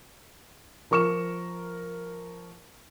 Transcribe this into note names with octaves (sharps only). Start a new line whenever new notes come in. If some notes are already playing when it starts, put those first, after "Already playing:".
F3 A#4 C#6 F6 E7